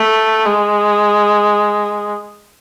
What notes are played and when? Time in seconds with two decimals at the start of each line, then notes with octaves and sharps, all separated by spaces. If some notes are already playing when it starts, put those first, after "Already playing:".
Already playing: A3
0.45 G#3